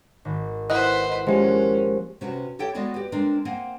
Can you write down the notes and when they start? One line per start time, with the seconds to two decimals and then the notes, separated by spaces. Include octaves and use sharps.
0.25 G#1
0.70 E4 B4 C5 D#5 F#5 F#6
1.27 F3 G#3 A#3 C#4 G4 C5
2.21 C3 C#4 F#4 B4
2.59 G4 A4 C#5 E5 G5
2.75 G#3 B3 F#4 D5 D#5
2.94 G4 B4
3.12 G#3 C4 D4 A#4
3.45 A#3 C4 F#5 G#5